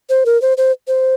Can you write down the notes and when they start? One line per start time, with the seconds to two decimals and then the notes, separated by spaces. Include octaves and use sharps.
0.10 C5
0.26 A#4
0.42 C5
0.58 C5
0.88 C5